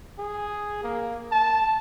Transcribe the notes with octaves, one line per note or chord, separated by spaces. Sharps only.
G#4
A#3
A5